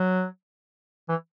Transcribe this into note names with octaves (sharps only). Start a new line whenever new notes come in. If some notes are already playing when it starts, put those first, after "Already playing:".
Already playing: F#3
E3